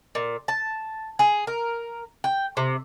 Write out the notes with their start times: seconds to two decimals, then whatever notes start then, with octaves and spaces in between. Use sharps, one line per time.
0.15 A#2
0.48 A5
1.19 G#4
1.47 A#4
2.24 G5
2.57 C3